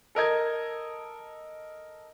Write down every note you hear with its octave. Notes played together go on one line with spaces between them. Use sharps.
A4 A#4 D#5 G#6